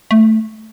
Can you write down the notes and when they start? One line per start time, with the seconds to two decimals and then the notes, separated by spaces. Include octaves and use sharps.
0.11 A3